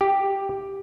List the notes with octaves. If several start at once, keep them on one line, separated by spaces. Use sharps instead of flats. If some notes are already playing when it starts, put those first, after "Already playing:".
G4